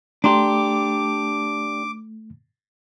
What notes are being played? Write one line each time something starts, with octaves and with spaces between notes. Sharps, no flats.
A3 D4 G4 A#5 C6 D6